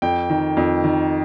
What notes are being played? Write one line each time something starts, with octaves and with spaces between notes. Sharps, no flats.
F2 G5
D#3
F2
D#3